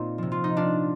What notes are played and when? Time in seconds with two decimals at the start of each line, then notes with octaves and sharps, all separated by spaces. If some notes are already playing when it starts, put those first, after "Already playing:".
Already playing: A#2 A#3 C4 D#4 F4
0.18 C3 F3
0.32 F4
0.44 D#4
0.57 D4 F4